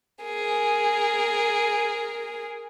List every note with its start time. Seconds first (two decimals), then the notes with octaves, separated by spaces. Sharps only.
0.23 G#4 A#4